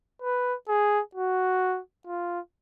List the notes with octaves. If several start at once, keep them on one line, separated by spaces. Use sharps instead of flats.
B4
G#4
F#4
F4